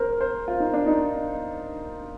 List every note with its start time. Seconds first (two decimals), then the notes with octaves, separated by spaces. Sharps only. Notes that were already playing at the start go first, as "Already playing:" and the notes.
Already playing: A#4 C5
0.21 C5
0.48 F4
0.60 D#4
0.74 D4
0.86 D#4